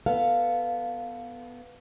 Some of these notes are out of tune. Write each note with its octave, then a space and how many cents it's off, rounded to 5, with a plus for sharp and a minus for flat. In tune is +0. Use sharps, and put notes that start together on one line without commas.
B3 +0 A4 +15 F5 +0